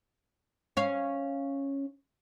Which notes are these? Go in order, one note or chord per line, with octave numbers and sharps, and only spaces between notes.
C#4 F5